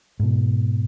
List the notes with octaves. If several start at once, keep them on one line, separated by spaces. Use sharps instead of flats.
G#2 B2